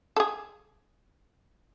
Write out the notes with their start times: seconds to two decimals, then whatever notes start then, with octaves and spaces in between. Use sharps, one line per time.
0.16 A4
0.20 G#4